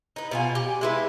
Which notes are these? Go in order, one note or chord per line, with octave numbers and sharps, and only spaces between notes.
D#4 B4
B2 F4 G#5
G4
G#3 E4 B4